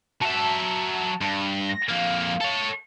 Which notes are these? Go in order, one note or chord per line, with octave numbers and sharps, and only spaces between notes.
F#3 E5 A5
G2
A#6
F2 A#3 F5
A4 C#5